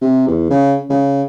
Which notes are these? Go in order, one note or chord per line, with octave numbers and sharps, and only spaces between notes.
C3
E2
C#3
C#3